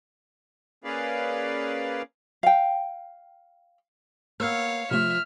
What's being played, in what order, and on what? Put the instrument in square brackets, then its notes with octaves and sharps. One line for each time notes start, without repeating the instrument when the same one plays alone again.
[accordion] A#3 C#4 G#4 B4 D5 F5
[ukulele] F5 G5
[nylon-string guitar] A#3 B3 [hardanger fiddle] C#5 F5 [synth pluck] E6 F6
[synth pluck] C3 A3 [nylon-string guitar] F3 [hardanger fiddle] E5 [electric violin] F6